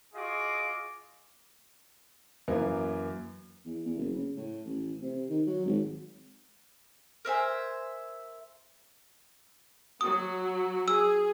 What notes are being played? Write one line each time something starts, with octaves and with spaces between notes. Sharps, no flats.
F4 F#4 G#4 D#5 D6
F#2 E3 A#3
E2
E2
F#1
C#3
A2
A1
C3
D#3
F#3
G#1
A#4 C5 E5 G#5
F#3 F#4 D#6
G#4 E6